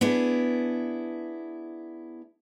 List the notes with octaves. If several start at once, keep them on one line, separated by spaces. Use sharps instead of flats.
B3 D4 E4 G#4